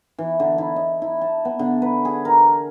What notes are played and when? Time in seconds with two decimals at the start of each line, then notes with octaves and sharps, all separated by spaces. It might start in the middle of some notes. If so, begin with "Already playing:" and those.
0.18 E3
0.40 D3
0.58 E4
0.76 D#5
1.02 E4
1.21 A5
1.45 B3
1.59 D3
1.82 B4
2.05 G#4
2.25 A#4